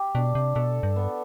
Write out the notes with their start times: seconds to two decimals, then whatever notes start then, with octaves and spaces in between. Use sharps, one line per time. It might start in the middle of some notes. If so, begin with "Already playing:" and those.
Already playing: G4
0.15 B2 D4
0.35 C3
0.55 B2 A4
0.83 G2
0.96 B3